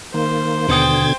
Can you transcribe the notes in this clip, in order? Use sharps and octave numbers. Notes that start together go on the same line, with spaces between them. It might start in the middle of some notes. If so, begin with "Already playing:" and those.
D#3 A#3 C5
D#2 B2 D3 B3 G5 D#6 G#6 A6